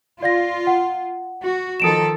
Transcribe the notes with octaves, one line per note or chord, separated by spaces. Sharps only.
F4 D5 F5 A#6
F#5
F#4
D#3 F3 A4 D#6 D7 E7